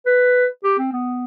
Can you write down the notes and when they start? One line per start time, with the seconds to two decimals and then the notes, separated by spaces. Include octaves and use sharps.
0.06 B4
0.64 G4
0.78 C4
0.92 B3